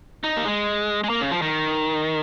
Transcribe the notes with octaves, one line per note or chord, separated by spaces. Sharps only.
D#4
A#3
G#3
G#3
A#3
C#3
F3
D#3